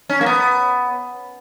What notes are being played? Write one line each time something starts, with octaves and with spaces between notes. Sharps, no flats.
C#4
A#3
B3